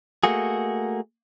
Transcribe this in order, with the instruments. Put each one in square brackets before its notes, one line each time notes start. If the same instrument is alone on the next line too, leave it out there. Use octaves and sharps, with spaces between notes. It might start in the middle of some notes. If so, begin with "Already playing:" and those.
[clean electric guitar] A3 A#3 F#4 G#4